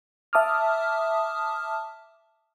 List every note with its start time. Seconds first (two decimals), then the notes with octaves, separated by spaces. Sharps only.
0.33 E5 A5 D6 D#6 F6